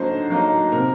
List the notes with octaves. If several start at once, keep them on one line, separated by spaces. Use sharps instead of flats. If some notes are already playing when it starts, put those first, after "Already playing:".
Already playing: D3 F#3 A#3 D#4 C5
F#3 A#3 D#4
C3 A#4